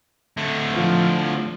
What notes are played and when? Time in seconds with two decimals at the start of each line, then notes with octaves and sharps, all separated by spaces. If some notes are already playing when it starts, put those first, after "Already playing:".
0.37 A2 D3
0.72 F3